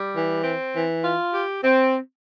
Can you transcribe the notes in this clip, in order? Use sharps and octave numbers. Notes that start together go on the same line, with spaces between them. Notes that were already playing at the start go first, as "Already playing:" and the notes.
Already playing: G3
E3
C4
E3
F4
G4
C4